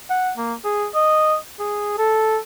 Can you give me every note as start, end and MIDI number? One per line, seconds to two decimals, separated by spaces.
0.10 0.32 78
0.38 0.54 58
0.64 0.86 68
0.95 1.37 75
1.60 1.96 68
1.98 2.38 69